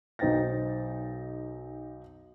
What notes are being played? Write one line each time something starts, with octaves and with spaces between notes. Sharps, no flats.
B1 D#4 C5 G5 A6 A#6